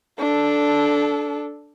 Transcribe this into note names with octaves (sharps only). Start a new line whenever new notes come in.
D4 A4